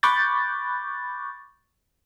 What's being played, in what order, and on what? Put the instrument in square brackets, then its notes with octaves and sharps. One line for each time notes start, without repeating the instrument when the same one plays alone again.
[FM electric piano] B5 C#6 D6 F#6 G6 A6